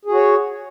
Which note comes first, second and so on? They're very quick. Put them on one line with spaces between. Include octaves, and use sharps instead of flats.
G#4 F#4 C#5